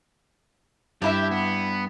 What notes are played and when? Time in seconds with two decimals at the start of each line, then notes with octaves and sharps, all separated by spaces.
1.02 G2 D4 E4 G4 E5
1.31 B3